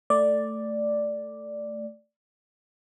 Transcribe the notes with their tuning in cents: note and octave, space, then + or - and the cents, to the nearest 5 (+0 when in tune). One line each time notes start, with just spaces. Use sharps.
A3 +10 D5 +0